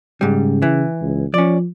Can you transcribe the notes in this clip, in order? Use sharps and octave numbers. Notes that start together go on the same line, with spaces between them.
G#2 C#3 G3
E3
C#2
F3 C#4 D5